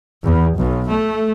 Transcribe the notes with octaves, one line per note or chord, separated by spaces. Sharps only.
E2
B1
A3